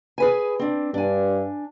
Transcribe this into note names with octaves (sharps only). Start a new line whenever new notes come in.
G#4 B4 G#5
C4 D4
G2 D4 G#5